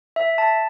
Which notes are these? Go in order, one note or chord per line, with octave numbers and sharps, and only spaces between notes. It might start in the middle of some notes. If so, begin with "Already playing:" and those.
E5
A5